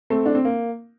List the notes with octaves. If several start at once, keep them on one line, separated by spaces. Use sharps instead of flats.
A3 C4
D4
C4
A#3